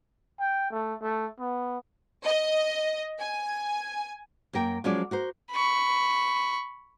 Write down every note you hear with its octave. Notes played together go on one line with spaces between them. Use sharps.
G5
A3
A3
B3
D#5
G#5
F#2 A#3 A#4 G5
F3 F#3 G#3 C#4 F4 D5
F#4 A#4 C5
B5 C#6